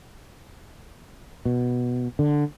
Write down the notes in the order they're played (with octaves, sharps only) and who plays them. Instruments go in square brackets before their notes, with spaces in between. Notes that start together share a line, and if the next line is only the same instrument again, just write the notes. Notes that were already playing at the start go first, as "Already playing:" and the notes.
[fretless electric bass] B2
D3